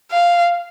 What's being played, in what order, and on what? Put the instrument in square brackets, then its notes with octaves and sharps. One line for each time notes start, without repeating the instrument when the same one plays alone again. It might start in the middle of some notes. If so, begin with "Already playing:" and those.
[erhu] F5